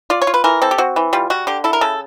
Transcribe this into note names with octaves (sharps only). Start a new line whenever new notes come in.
F4 D5
C#5
F4
B4
E3 A#4
C4 A4
G4
C4 F#4
E3
G3 F4
G3 F#4
D3 G4
E4 A4
A#4
C#3 A4